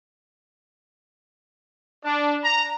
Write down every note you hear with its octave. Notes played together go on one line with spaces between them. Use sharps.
D4
A#5